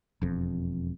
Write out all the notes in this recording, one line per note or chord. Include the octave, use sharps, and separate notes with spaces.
E1 F2